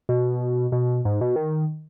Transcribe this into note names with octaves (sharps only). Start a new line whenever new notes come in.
B2
B2
G#2
B2
D#3